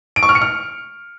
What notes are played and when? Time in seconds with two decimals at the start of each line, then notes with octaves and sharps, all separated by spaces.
0.16 D7
0.23 C#6
0.29 F6
0.35 C#7
0.42 F6